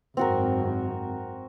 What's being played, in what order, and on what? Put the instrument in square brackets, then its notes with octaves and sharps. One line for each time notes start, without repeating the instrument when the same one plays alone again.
[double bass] G#1 F#2 [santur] C4 F#4 A#4